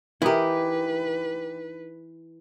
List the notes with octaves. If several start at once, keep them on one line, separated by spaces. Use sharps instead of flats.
E3 D#4 E4 G4 A#4 B4